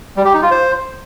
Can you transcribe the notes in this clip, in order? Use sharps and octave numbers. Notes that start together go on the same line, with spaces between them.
G3
G4
D#4
F4
C5